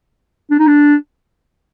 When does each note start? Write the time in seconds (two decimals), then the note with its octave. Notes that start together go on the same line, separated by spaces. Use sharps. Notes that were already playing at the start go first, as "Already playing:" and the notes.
0.51 D4
0.59 D#4
0.68 D4